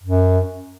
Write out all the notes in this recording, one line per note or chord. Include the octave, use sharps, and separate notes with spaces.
F#2